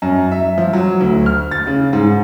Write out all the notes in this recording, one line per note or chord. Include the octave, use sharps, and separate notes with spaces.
F#2
E5
F3
F#3
D2
F6
A6
C#3
G#2